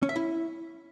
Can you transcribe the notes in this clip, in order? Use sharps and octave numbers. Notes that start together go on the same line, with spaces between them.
C#4
E5
E4